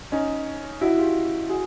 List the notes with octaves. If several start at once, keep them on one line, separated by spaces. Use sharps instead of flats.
C#4 D#4
E4 F#4
F4 G4
F#4 G#4